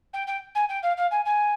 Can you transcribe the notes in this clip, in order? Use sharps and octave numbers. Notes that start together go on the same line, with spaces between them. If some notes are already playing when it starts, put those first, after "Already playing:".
G5
G5
G#5
G5
F5
F5
G#5
G#5